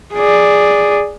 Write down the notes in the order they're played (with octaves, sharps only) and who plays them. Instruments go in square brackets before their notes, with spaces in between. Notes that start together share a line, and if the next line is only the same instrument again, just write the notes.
[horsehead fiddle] G#4 D5